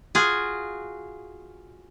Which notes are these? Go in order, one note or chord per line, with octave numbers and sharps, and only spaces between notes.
F4 F#4 G#4